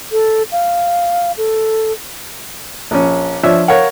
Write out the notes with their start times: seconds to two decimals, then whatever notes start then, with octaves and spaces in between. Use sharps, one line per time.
0.12 A4
0.52 F5
1.38 A4
2.91 A#1 C#4
3.43 F3 D4 C#5 E5
3.68 A#4 C#5 F5 F#5